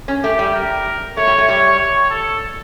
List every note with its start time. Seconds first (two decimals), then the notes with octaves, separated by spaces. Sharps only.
0.08 C#4
0.23 A3 G4
0.39 G3
0.54 A#4
1.17 A3 C#5
1.27 G3
1.38 A3
1.48 G3 C#5
1.79 C#5
2.10 A4